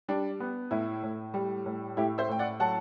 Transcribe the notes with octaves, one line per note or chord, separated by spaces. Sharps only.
G3 D4
B3
A2 E4
A2
G3
A2
A2 E4 G4
C5 E5
A2 G5
D5 F#5
F#3 F#5 A5